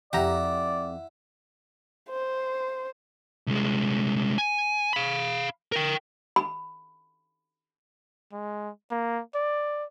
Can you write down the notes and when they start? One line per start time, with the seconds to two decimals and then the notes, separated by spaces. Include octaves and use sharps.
0.13 F2 E4 G4 D5 F#5 A#5
2.10 C5
3.47 C2 G#3
4.38 G#5
4.93 F5 B5
5.72 A#4 G5
6.36 B5
8.32 G#3
8.91 A#3
9.35 D5